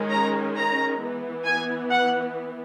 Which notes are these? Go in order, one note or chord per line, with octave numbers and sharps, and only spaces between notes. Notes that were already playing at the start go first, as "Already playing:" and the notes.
Already playing: D#3 G#3 C#4
A#5
A#5
E3 B3
G#5
F#5